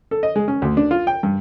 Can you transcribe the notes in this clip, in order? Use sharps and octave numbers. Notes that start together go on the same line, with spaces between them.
A4
D#5
G#3
C#4
D2
D4
F4
G5
G2